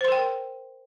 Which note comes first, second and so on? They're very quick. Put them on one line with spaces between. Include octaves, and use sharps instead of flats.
C5 C6 A#4 G5